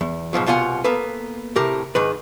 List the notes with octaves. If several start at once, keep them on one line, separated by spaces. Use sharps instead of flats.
E2
G#2 B2 F3 F#3
C2 B2 F4 F#5 G#5
A#3 B3 A4 B4
A2 C3 G4 A#4
G#2 D#3 B4